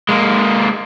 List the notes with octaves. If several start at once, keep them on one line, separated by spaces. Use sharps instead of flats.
G#3 A#3